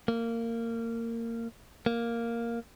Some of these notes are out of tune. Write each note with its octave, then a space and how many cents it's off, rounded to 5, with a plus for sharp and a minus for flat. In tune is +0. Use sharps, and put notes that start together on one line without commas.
A#3 -20
A#3 +0